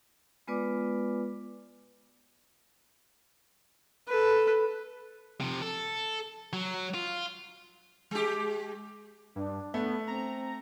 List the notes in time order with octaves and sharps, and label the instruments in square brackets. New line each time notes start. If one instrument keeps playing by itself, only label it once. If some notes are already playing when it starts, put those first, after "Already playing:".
[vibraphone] G#3 B3 F4 B4 D5 D6
[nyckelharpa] A4 B4
[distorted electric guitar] C3 F3
A4
F#3
F4
[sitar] G#3 G4
[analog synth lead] G2 [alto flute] D4
[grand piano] A3 [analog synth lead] B3
[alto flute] C4 [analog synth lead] A#5